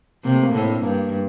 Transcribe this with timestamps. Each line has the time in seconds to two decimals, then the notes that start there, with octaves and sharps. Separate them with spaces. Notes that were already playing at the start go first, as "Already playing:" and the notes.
0.24 C3 A#3
0.35 A3
0.43 A#3
0.53 A2 C4
0.69 D4
0.82 G2 A#3